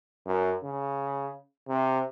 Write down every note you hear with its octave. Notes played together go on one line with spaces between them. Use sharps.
F#2
C#3
C3